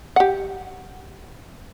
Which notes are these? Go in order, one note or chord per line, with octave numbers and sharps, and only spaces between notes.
G4 F#5